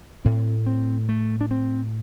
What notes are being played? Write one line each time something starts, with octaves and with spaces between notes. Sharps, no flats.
A2 C4
C4
A3
D4
C4